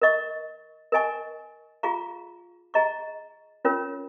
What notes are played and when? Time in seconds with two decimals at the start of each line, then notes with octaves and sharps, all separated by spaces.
0.02 A#4 D#5 C#6
0.92 A#4 D#5 G#5 C#6
1.83 F4 G#4 F5 A#5 C#6
2.74 G#4 D#5 A#5 C#6
3.65 C#4 F4 A#4 C#5